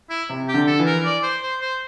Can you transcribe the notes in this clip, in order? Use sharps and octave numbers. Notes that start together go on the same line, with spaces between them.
E4
C3
G4
D3
A4
E3
A#4
D5
C5
C5
C5